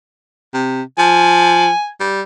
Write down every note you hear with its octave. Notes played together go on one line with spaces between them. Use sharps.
C3
F3 G#5
G3